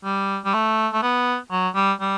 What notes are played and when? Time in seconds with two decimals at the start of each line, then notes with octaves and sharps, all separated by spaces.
0.04 G3
0.45 G3
0.54 A3
0.93 A3
1.03 B3
1.52 F#3
1.76 G3
2.01 G3